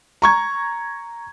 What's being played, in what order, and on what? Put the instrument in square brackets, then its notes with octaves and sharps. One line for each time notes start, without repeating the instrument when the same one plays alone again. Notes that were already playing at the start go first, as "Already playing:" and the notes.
[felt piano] A#5 C#6 G#6